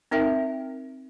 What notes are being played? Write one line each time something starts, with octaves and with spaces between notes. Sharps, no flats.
C4 D#4 A#4 E5 G5